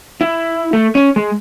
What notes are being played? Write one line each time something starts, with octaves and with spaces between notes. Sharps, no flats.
E4
A3
C#4
G#3